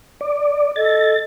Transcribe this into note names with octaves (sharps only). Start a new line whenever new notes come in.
D5
A4 D#5 A6